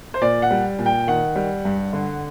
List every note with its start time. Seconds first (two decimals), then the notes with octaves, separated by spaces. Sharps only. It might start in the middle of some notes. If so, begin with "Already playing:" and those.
0.14 C5
0.21 A#2 D5
0.42 F#5
0.51 G3
0.79 A#2
0.86 G5
1.07 D#3 F#5
1.36 G3
1.65 G2
1.93 D3